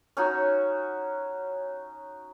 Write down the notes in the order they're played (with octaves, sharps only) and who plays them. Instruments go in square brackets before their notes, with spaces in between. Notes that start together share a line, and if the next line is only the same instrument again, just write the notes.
[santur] C#4 D#4 F#4